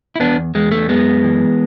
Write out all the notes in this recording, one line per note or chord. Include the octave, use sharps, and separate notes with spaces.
E4
E2 B3 D4
E2 G#3
A3
F#2 G#3 B3
E3